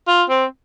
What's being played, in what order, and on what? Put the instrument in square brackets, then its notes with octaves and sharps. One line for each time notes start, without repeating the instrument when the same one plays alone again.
[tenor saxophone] F4
C4